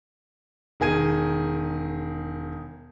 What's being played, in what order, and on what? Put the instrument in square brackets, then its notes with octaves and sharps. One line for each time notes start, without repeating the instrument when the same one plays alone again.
[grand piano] E1 D#3 G#4 G#6 D#7